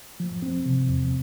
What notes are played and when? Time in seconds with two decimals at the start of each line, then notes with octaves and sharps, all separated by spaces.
0.20 F3
0.42 C4
0.65 C3
0.89 E2